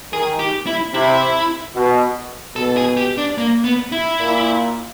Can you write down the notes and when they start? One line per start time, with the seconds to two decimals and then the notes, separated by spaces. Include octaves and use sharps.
0.12 D#3 G#4
0.39 G4
0.67 E4
0.94 C3 E4
1.75 B2
2.56 B2 A4
2.77 G#4
2.97 G4
3.18 D4
3.38 A#3
3.64 B3
3.92 E4
4.19 A#2